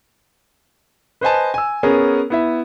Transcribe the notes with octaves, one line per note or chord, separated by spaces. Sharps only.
B4 C5 D#5 G#5 A5
G#5 E6
B3 C#4 G#4 A#4
B3 E4 E5